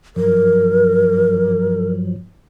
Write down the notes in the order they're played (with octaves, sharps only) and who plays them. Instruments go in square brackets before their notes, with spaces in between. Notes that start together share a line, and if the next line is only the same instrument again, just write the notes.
[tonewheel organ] G2 F3 F#3 [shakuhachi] A#4